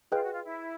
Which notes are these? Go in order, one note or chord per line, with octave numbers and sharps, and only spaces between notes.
F4 G#4 B4 D#5 G5
F#4
F4
E4